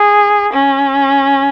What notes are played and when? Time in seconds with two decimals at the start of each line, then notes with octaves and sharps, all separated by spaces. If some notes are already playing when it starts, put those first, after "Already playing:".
Already playing: G#4
0.53 C#4